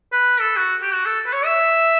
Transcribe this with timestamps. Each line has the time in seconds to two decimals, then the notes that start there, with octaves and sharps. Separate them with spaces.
0.12 B4
0.40 A4
0.56 F#4
0.82 G4
0.93 F#4
1.06 A4
1.26 B4
1.33 C#5
1.46 E5